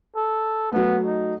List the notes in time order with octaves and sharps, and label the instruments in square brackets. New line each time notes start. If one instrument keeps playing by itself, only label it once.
[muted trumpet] A4
[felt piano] F#3 A3 [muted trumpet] B3
[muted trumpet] D#4